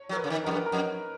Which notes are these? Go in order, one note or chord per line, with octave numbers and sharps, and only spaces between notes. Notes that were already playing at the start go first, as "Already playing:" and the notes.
Already playing: C#5
F#3
A#4
B4
C#3
D#3
F2 A#4
F#2
B4
A#4
F2